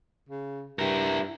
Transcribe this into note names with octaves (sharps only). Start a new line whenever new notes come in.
C#3
G2 E4 A#4